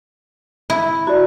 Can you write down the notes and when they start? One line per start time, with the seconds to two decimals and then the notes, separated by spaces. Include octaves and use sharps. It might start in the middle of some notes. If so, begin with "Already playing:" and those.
0.70 E4
1.07 E4 F#4 G4 D5